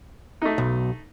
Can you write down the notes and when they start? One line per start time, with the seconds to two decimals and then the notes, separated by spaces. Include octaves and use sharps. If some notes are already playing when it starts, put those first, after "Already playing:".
0.42 A3 D#4
0.58 B1